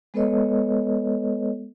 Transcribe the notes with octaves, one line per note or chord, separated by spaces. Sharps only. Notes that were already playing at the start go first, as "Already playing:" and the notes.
G#3 B3 A4 B4 C#5 D#5